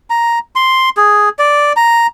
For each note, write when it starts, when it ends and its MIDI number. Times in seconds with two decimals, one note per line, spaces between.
0.10 0.39 82
0.55 0.89 84
0.97 1.29 68
1.39 1.73 74
1.76 2.07 82